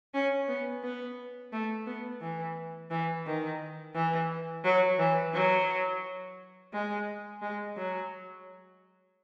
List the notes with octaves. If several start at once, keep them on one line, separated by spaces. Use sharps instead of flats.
C#4
B3
B3
A3
B3
E3
E3
D#3
E3
F#3
E3
F#3
G#3
G#3
F#3